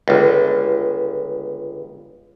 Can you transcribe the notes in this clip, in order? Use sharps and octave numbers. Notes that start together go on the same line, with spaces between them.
G1 C#2